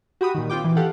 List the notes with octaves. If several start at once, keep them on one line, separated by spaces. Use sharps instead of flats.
F#4 G4 B5 D#6
A#2 D#3
C4 F4 G5 D6
E3
G4 A4 F5 F#5